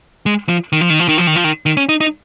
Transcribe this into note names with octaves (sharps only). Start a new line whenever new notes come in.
G#3
F3
D#3
F3
D#3
F3
D#3
F3
D#3
F3
D#3
D#3
C#4
D#4
D#4